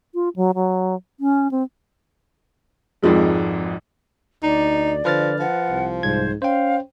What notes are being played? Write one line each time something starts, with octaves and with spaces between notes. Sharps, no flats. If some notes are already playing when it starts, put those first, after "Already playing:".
F4
F#3
F#3
C#4
C4
G#1 F2 G#2 F3 G#3
D2 D#4 D5
D3 F3 B4 F6 A6
F3 F#5
C2
C2 G#2 C5 G#6
C#4 C5 F5 G5